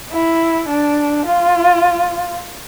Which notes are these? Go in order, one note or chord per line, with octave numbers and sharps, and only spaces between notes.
E4
D4
F4